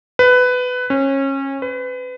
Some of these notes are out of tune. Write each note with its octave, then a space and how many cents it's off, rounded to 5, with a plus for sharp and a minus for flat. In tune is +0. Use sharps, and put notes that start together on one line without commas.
B4 +15
C#4 -25
B4 +30